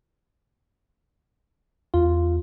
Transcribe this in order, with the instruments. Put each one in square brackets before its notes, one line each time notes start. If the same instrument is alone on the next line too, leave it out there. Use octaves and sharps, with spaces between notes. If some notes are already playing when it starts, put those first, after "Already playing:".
[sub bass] E2 [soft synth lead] F4